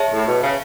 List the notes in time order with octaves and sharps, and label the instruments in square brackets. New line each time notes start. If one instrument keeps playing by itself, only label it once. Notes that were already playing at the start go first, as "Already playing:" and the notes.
Already playing: [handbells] G#4 C#5 E5 A5
[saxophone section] A2
B2
C#3